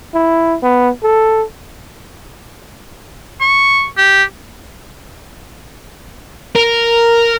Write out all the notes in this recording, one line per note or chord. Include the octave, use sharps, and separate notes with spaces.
E4
B3
A4
C#6
G4
A#4